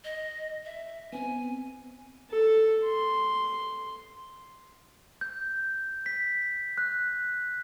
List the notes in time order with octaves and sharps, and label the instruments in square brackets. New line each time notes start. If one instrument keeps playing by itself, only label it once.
[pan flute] D#5
E5
[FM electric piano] B3 C4 [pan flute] G#5
[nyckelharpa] A4
C6
[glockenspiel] G6
B6
F#6